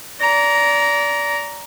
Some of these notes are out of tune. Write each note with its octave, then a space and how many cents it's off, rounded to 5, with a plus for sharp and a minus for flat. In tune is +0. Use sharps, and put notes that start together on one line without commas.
D5 -25 A#5 +5